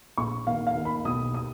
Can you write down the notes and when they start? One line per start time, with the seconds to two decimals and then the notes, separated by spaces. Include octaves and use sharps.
0.18 A#1 C#6
0.47 D#2 F5
0.67 F5
0.75 D#2
0.85 B5
1.05 B1 D#6
1.34 D#6